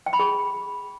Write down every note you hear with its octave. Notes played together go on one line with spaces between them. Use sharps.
G5
B5
G#4